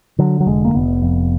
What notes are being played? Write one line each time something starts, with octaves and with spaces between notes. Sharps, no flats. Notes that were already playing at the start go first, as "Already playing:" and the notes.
D3 F#3
F#3
F1 G#3
A#3
F1 B3
F2